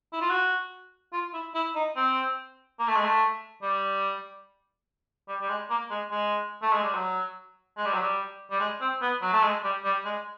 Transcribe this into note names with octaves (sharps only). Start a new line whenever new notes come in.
E4
F4
F#4
F4
E4
E4
D#4
C4
A#3
A3
G#3
A3
G3
G3
G3
G#3
A#3
G#3
G#3
A3
G#3
G3
F#3
G#3
G3
F#3
G3
G3
G#3
C4
B3
F#3
A3
G#3
G3
G3
G#3